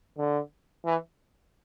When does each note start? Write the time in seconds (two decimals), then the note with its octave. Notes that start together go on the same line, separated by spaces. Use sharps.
0.18 D3
0.85 E3